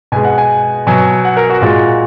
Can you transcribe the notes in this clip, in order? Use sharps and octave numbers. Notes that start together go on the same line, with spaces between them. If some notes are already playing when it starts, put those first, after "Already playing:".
B2 G#3 G#5
F#5
G#5
B2 F#3 G#5
F#5
A#4
F#4
A#2 G#3